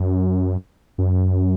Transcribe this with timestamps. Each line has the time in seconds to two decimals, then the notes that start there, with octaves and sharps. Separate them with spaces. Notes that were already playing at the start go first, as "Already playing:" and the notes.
Already playing: F#2
0.98 F#2